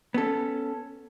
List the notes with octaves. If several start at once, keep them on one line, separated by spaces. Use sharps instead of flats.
B3 C#4 A4